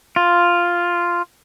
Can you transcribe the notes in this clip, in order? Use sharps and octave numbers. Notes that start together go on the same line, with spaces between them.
F4